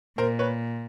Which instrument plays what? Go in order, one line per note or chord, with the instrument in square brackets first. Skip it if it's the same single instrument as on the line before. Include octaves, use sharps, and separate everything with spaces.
[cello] A#2 [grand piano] A#4 C5
[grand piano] B4 C#5